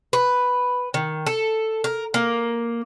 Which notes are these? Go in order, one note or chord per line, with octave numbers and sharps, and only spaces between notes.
B4
D#3
A4
A#4
A#3